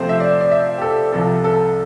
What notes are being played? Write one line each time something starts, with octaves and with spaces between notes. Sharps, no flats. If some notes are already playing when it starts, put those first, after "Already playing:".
Already playing: C3 F3 A3 C4 C5
E5
D5
D5
E5
G4
A4
C2 C3 F3 A4
A4